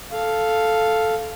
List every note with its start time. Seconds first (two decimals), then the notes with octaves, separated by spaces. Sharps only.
0.12 A4 F5